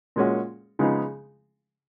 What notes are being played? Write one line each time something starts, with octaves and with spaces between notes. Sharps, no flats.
A#2 G#3 C#4 F#4
C#3 F3 G#3 B3 D#4